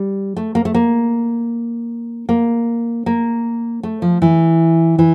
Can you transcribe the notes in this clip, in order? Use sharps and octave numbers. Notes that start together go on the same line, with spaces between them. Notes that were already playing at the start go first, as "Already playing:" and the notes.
Already playing: G3
A3
A#3
A3
A#3
A#3
A#3
A3
F3
E3
E3